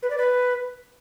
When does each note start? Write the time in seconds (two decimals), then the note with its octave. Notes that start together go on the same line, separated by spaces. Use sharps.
0.03 B4
0.10 D5
0.18 B4